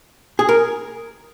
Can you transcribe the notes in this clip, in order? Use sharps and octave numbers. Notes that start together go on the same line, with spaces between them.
G#4
A#4